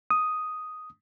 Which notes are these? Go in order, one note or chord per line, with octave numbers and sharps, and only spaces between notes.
D#6